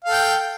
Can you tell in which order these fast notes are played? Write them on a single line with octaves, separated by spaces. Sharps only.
F5 A4 G5